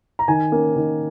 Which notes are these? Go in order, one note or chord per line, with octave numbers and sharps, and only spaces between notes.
A#5
D#3 G#5
A#3 C#4
D#3